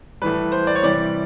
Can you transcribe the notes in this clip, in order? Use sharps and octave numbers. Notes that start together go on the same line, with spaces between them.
A2 E3 G3 B4
C5
D5
C#5
C3 E3 G3 D5